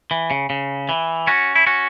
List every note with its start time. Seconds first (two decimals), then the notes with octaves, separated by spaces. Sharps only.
0.11 E3
0.31 C#3
0.50 C#3
0.89 E3
1.27 C#4 F#4
1.56 E4
1.67 C#4 F#4